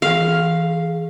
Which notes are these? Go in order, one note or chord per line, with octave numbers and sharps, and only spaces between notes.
E3 G#4 F5